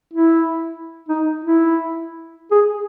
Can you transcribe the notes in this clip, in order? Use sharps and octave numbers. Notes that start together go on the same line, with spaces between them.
E4
D#4
E4
G#4